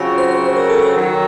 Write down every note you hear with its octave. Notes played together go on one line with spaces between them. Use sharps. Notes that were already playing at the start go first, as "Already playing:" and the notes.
Already playing: C#3 F#3 C4 F4 F#4
C5
C5
C5
A#4
A4
A#4
D#3 F#3